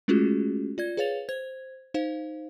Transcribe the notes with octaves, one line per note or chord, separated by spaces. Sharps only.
G#3 A3 C#4 F4 F#4 G#4
F4 D5 G#6
G#4 B4 C#5 F5 A6 F7
C5 G#6
D#4 C5 F5